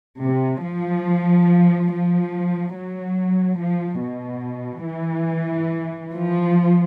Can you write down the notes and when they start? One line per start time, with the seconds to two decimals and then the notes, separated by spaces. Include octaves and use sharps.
0.22 C3
0.65 F3
1.92 F3
2.76 F#3
3.59 F3
4.01 B2
4.85 E3
6.12 F3